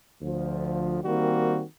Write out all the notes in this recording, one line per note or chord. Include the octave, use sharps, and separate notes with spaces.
D2 F3
D#3 G3 A#3 C4 F#4